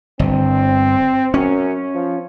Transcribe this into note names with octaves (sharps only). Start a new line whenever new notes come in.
G1 C4
F#2 C#4
F3